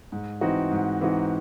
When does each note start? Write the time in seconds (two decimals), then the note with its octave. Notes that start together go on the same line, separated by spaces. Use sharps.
0.12 G#2
0.41 E3 C4 D#4 F#4
0.71 G#2
1.01 E3 C4 D#4 F#4